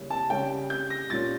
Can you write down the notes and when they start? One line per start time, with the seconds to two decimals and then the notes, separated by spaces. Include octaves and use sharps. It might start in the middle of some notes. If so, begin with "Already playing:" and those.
Already playing: C#3 G3 A#3 E4
0.10 A5
0.30 C#3 G3 C#4 G5
0.70 G6
0.90 A#6
1.10 A#2 G3 C#4 F4 A6